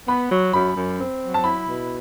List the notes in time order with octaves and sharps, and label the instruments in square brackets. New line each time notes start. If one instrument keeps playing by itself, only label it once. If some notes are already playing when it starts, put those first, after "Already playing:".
[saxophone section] B3 [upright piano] B5
[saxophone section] F#3
[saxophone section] F#2 [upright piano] B5
[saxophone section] F#2
C4
F#3
[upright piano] A5
[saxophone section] E4 [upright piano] B5
[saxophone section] B2